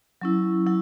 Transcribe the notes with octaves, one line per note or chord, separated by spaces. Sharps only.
F#3 C#4 E4
F#3 E4